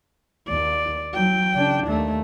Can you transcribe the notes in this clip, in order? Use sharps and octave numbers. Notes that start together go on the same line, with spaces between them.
D#2 D5
F#3 G5
C#3 D4
D#2 A3